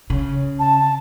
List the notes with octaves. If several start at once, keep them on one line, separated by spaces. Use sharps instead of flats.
C#3
A5